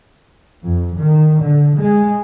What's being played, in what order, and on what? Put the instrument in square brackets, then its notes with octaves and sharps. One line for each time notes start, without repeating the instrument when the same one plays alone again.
[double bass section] F2
D#3
D3
G#3